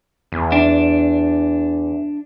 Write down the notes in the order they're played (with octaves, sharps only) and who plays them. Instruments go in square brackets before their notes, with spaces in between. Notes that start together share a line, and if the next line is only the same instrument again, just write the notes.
[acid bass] E2
[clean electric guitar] D4